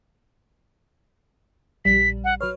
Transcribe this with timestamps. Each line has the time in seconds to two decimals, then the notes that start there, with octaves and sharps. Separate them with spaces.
1.85 A#1 G3 B6
2.24 F#5
2.41 F#3 B4 C#5 F6